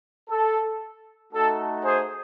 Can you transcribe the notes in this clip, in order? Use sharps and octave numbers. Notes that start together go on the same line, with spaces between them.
A4
A3 D#4 F#4 A4
G#4 C5